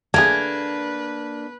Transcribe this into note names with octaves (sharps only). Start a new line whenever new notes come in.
A3 A#3 D4 G#4 B4 G#6